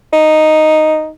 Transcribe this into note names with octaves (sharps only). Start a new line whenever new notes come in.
D#4